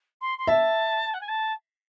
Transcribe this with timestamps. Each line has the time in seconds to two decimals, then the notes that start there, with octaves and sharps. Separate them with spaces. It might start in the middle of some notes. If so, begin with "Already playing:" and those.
0.21 C6
0.38 C6
0.47 E5 A5
1.14 F#5
1.21 G#5
1.28 A5